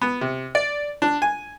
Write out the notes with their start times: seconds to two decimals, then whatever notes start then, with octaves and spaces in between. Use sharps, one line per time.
0.01 B3
0.21 C3
0.55 D5
1.02 D4
1.22 G#5